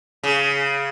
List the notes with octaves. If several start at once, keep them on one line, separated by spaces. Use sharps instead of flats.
C#3